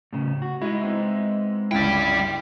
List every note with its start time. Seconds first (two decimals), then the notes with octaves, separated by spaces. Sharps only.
0.13 A2 C#3
0.42 F#4
0.62 G#3 D#4 E4
0.81 B3 C4 E5
1.71 G1 C#2 E4 D5 G5